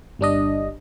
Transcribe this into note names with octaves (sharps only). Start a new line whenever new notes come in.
G1 G3 D4 D#5